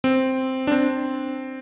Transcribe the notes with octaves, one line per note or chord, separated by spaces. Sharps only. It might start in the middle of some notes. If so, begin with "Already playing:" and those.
C4
D4
C4